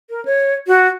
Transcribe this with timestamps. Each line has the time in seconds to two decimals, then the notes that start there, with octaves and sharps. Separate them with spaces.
0.10 A#4
0.25 C#5
0.67 F#4